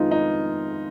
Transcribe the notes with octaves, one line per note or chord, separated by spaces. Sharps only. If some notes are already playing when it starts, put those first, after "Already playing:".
Already playing: F2 D#3 G#3 B3 D#4 F4
D#4